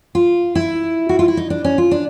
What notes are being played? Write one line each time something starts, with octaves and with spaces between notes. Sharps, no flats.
F4
E4
F#4
F4
E4
D#4
D4
C#4
F4
D4